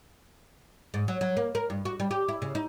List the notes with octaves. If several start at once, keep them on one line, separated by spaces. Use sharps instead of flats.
G#2
F#3
F#3
A#3
A#4
G2
F#4
G3
G4
E4
C#3
D#4